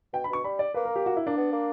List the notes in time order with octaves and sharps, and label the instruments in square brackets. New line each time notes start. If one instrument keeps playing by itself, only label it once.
[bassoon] B2 [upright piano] G5
[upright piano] B5
[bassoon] B2 [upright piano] C#6
[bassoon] G3 [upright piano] B5
[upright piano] D5
[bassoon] A#3 [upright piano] B4
[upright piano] A#4
G4
F#4
E4
[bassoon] A#3 [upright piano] D4
[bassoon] B3
A#3